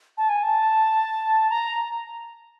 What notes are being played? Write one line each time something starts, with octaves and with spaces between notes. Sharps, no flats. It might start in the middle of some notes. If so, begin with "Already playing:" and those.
A5
G#5
A5
A#5